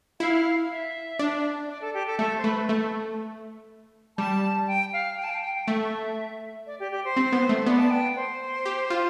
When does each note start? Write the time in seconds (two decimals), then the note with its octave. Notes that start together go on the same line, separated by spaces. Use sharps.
0.20 E4 F5
0.70 E5
1.19 D4
1.69 D5
1.82 A4
1.94 G4
2.07 A4
2.19 A3 A4
2.38 C5
2.44 A3 B4
2.69 A3
4.18 G3 A5
4.68 G5
4.93 F5
5.17 G5
5.24 A5
5.30 G5
5.42 G5
5.55 G5
5.67 A3 E5
6.67 D5
6.80 G4
6.91 G4
7.05 C5
7.16 C4
7.33 B3
7.49 A3
7.66 B3 D5
7.79 A5
7.90 G5
8.16 C5
8.65 G4
8.90 F4